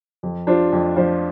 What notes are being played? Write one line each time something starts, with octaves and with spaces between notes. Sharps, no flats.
F2
F3 D4 F4 C5
F2
F3 D4 F4 C5